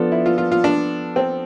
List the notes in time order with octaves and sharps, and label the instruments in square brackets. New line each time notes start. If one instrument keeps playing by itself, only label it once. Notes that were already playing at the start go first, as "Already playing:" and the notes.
Already playing: [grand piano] F3 B3 D4 A4
[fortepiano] E4
F4
F4
F4
D4
C4